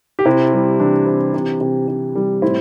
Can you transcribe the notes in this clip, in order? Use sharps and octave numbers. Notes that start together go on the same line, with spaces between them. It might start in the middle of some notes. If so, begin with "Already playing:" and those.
G4
C3 C4 E4
G3
E3 D4
C3
C3
C3
C3
G3
A2 C4 E4